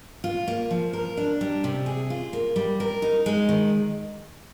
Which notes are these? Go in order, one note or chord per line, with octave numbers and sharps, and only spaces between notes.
F4
A#3
F3
A#4
D4
G3
C3
G#4
F4
A#3
G3
A#4
D#4
G#3
D#3